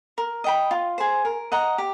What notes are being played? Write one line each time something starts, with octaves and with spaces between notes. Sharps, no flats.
A#4
D#5 G5 B5
F4
G#4 C5
A#4
D#5 F#5 A#5
G4